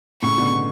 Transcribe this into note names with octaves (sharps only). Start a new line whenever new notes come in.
A2 C#3 C#6
B2 D3
B2